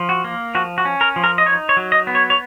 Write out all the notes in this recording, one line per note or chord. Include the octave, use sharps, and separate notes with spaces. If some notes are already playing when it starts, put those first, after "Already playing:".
Already playing: F3
F#4
A#3
F3 F#4
F#4
C#4
A#4
F3
A#4
D#5
D#4 C#5
C#5
F#3
D#5
B3
C#5
C#5